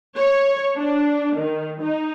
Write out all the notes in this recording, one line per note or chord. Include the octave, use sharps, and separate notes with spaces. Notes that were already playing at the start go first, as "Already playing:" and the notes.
C#5
D4
D#3
D#4